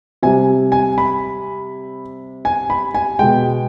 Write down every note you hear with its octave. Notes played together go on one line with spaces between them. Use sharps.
C3 G3 G#5
G#5
B5
G#5
B5
G#5
B2 G#3 G5